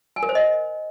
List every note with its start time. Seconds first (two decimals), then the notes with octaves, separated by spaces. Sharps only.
0.16 G#5
0.23 A#4
0.29 C5
0.35 D#5